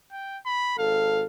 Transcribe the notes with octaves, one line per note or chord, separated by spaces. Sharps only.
G5
B5
G#1 A4 F5